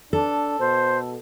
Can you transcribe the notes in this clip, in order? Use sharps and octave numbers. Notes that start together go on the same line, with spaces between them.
D4 A4
B2 C5